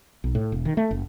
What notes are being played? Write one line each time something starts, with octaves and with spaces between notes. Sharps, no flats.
B1
A2
E1
D#3
A3
F#1